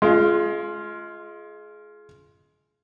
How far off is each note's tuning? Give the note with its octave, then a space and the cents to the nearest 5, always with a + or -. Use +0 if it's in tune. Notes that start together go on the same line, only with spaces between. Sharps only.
G#3 +25 F4 -10